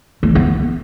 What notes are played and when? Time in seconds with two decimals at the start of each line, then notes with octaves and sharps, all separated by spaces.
0.23 A3
0.29 E3
0.35 B3